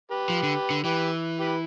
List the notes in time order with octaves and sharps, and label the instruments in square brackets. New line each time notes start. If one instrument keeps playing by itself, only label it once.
[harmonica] G4 B4
[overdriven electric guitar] F3
D3
D3
[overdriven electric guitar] E3 [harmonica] G4 B4
[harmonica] G4 B4